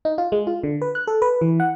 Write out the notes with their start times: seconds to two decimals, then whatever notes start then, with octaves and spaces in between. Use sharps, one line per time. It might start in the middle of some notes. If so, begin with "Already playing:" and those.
0.05 D#4
0.18 F4
0.32 G#3
0.47 F4
0.63 D3
0.82 B4
0.95 F#6
1.07 A4
1.22 B4
1.41 E3
1.60 F#5